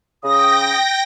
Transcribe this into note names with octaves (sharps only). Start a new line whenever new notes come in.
C#3 G5 D#6 A#6